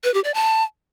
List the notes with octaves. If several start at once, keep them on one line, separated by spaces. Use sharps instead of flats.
B4
G4
D5
A5